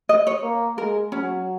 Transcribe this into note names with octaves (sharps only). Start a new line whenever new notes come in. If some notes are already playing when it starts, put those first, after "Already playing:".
D#5
C#5
A#3
G#3 A#4
F#3 C#4